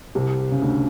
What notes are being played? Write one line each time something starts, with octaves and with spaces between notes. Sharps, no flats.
C2 C3
C#3
D2 D3